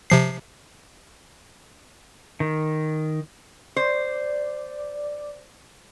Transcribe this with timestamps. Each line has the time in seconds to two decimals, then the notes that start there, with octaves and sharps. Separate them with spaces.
0.10 C3 F3 C7
2.40 D#3
3.76 C5 D5